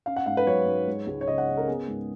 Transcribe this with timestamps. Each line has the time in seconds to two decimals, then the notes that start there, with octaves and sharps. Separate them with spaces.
0.06 C#4 F5
0.16 F#5
0.26 G#2 F5
0.37 B4
0.47 F#3 C#5
0.66 G#2
0.87 G#3
1.07 C#2
1.21 C#5
1.28 C#3 D#5
1.38 F#5
1.48 C#4
1.57 A#4
1.68 B3 G#4
1.88 G#2